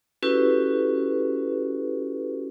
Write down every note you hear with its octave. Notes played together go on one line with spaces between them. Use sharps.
C#4 E4 F#4 G4 A4 B4